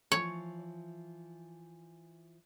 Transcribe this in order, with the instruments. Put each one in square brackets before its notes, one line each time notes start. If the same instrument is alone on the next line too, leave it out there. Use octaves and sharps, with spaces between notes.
[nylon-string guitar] E3 F3 [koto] C#5